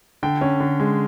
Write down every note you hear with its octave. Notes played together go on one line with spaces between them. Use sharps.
D3 G5
C#4
D3
G#3